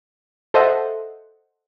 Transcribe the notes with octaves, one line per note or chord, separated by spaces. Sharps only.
A4 C5 D#5 E5 F#5